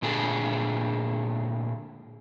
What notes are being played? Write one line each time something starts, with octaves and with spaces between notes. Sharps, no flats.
A#2 D3 A3 G#4 A4